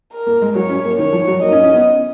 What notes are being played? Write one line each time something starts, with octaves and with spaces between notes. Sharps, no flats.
A#4
A#3
G#3
F#3 C#5
C#4
A#3
D#3 C#5
F3
F#3
A#3 D#5
D#4
C#4
C#4
B3